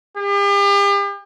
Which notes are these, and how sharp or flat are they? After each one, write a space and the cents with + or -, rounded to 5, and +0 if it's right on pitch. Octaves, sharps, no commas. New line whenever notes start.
G4 +40